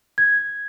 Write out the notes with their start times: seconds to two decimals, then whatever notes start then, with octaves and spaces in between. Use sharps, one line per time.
0.18 G#6